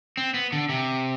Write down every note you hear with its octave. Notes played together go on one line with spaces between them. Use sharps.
C4
B3
D3
C3